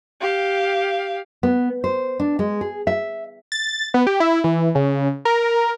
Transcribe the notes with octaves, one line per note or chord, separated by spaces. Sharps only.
G4 F5
B3
C5
D4
G#3
G#4
E5
A6
B3
G4
E4
E3
C#3
A#4